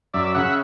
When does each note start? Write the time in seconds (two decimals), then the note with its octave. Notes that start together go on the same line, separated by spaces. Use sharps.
0.14 F#2 D5 E5
0.35 C#3 E5 F#5